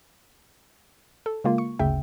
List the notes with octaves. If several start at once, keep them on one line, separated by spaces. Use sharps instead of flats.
A4
C#3 G#3 A#3 F4
C#6
G1 D2 C#3 E5 G5